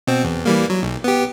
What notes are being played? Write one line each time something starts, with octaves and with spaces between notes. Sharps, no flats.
B2 C4
E2
E3 G3 A#3
F#3
B1
B3 G4